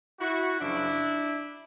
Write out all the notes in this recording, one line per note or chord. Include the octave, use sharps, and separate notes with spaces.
E4 F#4
F#2 C#3 F3 D4 E4